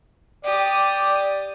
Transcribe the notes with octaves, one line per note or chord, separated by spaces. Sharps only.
G4 D5 D#6